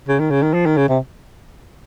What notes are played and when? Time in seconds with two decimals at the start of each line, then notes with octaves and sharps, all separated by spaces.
0.08 C#3
0.19 D#3
0.30 C#3
0.42 D#3
0.54 F3
0.66 D#3
0.77 C#3
0.88 C3